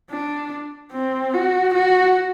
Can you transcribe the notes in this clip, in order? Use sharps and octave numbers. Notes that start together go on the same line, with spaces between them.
D4
C4
F#4
F#4